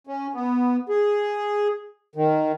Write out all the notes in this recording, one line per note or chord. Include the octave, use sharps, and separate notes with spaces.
C#4
B3
G#4
D#3